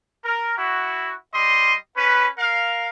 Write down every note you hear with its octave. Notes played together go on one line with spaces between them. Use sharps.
A#4
E4 F#4
G3 D#5 C6
C#4 B4
A#4 F5